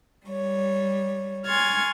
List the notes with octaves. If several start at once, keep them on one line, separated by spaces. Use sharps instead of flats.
G3 C#5
G#5 C6 C#6 F6 G#6 A6